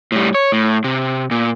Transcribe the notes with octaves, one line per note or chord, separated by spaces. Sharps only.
A2 G3
C#5
A2
C3
A#2